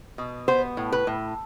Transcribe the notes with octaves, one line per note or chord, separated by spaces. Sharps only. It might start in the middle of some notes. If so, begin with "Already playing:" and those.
B2
B3 C5
A2
B4
A2